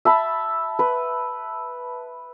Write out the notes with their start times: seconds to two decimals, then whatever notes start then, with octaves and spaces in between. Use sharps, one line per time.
0.05 E5 A5 B5
0.79 B4